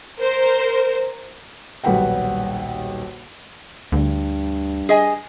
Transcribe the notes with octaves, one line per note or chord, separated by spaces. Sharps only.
A#4 C5
D#1 B1 G3 B4 F#5 G5
D2 G2
G#4 D#5 G#5